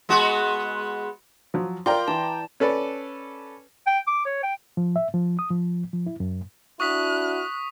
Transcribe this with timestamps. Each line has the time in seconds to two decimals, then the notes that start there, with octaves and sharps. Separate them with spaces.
0.09 G#3 B3 F#4
1.54 F3 F#3
1.86 F4 A#4 D5 G5 A#5 C6
2.08 E3 A5
2.60 C#4 A4 B4 D5
3.87 G5
4.07 D6
4.26 C#5
4.43 G5
4.77 F3
4.96 E5
5.14 F3
5.39 D#6
5.51 F3
5.93 F3
6.06 E4
6.20 F#2
6.80 D4 E4 F#4 C#6 D#6 F#6 B6